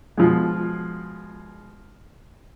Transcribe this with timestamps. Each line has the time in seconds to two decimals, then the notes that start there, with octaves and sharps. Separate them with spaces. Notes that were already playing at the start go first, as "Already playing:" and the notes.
0.17 B2 F3 G#3